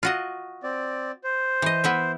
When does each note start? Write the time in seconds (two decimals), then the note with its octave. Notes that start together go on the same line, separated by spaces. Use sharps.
0.03 F4 F#4 D#5
0.63 C4 D5
1.24 C5
1.62 E3 D#5
1.84 B3 E4 E5